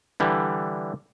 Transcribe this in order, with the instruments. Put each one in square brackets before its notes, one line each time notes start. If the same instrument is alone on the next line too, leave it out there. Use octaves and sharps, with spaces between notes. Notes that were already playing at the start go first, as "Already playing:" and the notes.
[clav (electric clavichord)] D3 E3 G3